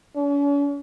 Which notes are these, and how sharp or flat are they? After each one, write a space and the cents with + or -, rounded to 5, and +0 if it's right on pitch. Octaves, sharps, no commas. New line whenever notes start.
C#4 +45